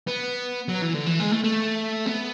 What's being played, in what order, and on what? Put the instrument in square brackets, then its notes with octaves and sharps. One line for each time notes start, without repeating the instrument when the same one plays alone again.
[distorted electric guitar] B3
F#3
E3
D3
E3
G#3
A3
A3
B3